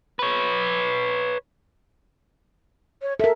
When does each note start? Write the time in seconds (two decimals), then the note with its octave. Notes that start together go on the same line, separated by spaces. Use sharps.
0.19 B4 C#5
3.02 C#5
3.20 A4 A#4 E5